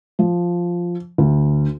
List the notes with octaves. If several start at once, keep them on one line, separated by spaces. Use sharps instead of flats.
F3
D2